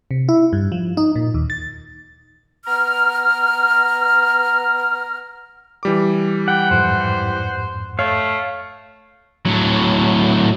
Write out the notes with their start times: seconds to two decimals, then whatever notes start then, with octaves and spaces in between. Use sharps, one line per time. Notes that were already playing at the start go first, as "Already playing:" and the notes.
0.11 C3
0.29 E4
0.53 G2
0.72 F3
0.97 D#4
1.16 A#2
1.34 D#2
1.50 A6
2.66 B3 A#5 F6
5.83 E3 G3 D6
6.48 F#5 G5
6.71 F2 G#2 C5
7.99 A3 C#5 F5
9.46 A2 F#3